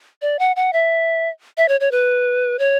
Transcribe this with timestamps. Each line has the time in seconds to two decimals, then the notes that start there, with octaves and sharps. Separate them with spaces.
0.22 D5
0.39 F#5
0.56 F#5
0.73 E5
1.57 E5
1.68 C#5
1.80 C#5
1.91 B4
2.59 C#5